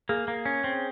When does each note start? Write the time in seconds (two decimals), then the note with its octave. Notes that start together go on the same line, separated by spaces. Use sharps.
0.09 A#3 G#4
0.28 A#3
0.46 C#4
0.64 C4